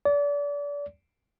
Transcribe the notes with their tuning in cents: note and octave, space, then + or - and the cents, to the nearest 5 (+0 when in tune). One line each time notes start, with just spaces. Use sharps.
D5 -30